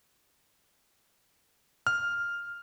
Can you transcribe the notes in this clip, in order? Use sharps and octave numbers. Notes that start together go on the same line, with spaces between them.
F6